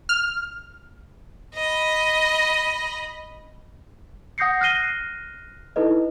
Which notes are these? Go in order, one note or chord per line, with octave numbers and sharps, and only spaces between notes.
F6
D#5 B5
F#5 D#6 G6 A#6 C7 C#7
F6 F#6 A#6 C7 D#7 G7
D#4 E4 A4 B4 D#5